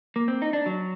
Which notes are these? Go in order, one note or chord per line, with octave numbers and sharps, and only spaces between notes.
A#3
C4
D#4
D4
F#3